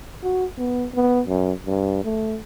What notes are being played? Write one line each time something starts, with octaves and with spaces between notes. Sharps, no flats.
F#4
B3
B3
F#2
G2
A3